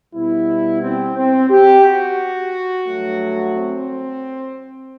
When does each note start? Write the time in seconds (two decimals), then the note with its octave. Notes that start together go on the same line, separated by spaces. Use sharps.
0.14 B2 G3 B3 E4
0.83 C4
1.16 C4
1.50 G4
1.84 F#4
2.86 G2 F#3 A3
3.54 C4